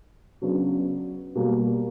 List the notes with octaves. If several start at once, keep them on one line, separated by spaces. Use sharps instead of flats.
C#3 F#3 B3 D4
B2 G3 A#3